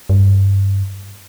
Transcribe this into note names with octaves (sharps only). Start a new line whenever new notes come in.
G2